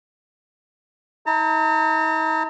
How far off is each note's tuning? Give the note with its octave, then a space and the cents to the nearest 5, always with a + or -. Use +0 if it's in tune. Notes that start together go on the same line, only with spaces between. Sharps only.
D#4 +45 A#5 -40